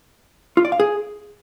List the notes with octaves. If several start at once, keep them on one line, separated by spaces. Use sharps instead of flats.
F4
D5
F5
G#4